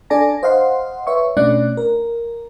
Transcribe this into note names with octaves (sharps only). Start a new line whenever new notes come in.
D4 A4 D5 G#5 A5 A#6
C5 D#5 F5 F#5 C6
B4 C#5 E5 C#6
B2 A3 C#4 D4 D5 F#6
A#4